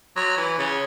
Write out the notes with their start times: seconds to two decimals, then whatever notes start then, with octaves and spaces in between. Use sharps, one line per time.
0.16 F#3
0.37 E3
0.58 C#3